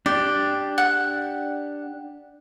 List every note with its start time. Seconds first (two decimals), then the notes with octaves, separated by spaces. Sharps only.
0.06 D4 G4 D5
0.78 F#5